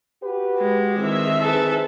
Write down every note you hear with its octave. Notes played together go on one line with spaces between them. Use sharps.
F#4 G4 B4
G#3
D#3 E3 C4 G#4 E5
F2 E3 G#4 A4 B4